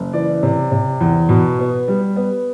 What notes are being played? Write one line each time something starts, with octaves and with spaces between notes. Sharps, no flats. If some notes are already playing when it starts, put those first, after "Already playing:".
Already playing: F#1
E3 D5
C3
C3
E2
B2
B3
G3
B3